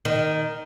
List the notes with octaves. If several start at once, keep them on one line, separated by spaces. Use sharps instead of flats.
D#3